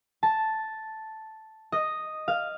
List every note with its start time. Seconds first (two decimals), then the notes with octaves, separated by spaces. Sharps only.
0.23 A5
1.72 D#5
2.28 F5